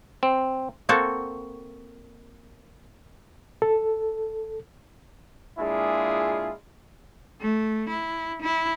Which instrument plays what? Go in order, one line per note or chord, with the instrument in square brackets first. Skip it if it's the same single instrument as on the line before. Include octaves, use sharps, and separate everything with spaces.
[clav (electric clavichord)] C4
[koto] A#3 C4 F#4 A4
[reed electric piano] A4
[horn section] A#2 G#3 D4 E4 F4 G#4
[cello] A3
E4
E4